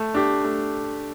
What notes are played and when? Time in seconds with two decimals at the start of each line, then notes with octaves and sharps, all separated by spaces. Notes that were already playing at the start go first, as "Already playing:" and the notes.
Already playing: A3
0.14 D4 G4
0.44 A3